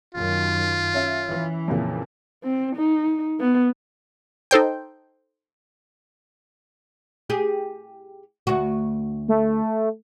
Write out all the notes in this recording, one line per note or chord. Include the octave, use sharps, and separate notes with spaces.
F#2 D#3 F4
C#4 E5
E3
F2 A#2 C#3
C4
D#4
B3
D#4 A4 C5 G5
G4 G#4
D2 F#4
A3